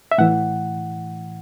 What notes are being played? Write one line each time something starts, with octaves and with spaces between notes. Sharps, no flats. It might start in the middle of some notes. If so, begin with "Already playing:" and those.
E5
A2 E3 F#5